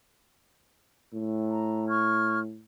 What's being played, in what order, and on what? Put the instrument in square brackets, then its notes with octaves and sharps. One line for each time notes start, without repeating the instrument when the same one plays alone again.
[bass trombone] A2
[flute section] A#5
C#6 F6 G#6